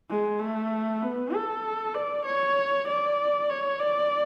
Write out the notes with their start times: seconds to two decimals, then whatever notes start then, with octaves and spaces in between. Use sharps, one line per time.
0.10 G#3
0.40 A3
1.02 B3
1.34 A4
1.95 D5
2.26 C#5
2.88 D5
3.50 C#5
3.80 D5